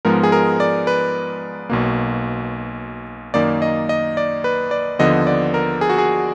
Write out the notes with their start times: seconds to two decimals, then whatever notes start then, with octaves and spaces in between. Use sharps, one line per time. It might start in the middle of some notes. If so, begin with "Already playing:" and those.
0.05 G#2 F3 G#3 B3 A#4
0.23 G#4
0.32 A#4
0.60 D5
0.87 B4
1.70 B1 B2 A#3
3.34 F#2 D#3 A#3 D5
3.62 D#5
3.89 D#5
4.17 D5
4.44 B4
4.71 D5
4.99 D#2 D3 F3 B3 D#5
5.27 D5
5.54 A#4
5.81 G#4
5.90 F#4
5.98 G#4